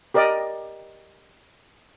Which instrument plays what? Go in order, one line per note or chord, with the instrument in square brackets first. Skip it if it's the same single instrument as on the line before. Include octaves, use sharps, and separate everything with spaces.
[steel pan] G4 A#4 D5 D#5